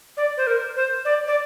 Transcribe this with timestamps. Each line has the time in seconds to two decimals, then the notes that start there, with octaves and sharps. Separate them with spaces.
0.17 D5
0.37 C5
0.47 A#4
0.76 C5
1.05 D5
1.27 D5